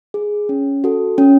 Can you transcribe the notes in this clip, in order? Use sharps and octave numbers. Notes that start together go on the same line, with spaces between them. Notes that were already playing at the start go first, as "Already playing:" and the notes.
G#4
C#4
F#4 A4
C#4